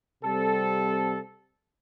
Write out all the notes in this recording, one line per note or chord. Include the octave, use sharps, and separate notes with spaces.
C3 G3 C4 A4